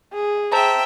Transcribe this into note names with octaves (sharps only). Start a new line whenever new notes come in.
G#4
C5 E5 G5 A5 A#5